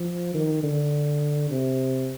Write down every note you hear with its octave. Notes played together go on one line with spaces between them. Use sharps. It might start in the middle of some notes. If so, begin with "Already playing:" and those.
Already playing: F3
D#3
D3
C3